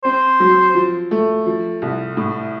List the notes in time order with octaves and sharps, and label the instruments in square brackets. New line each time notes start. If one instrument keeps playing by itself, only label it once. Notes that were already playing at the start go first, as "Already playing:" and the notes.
[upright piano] C4 [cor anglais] C5
[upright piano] F#3
F3
A3
F3
C2
A2